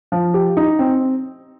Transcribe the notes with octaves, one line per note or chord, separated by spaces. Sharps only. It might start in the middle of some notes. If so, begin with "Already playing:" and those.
F3
G4
D#4
C4